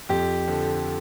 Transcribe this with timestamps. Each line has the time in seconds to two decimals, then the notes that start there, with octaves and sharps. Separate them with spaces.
0.09 F2 G4
0.47 D3 F3